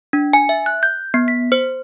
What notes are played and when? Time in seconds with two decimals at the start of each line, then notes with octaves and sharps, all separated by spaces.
0.13 D4
0.33 G#5
0.49 E5
0.66 F#6
0.83 G6
1.14 B3
1.28 B6
1.52 C5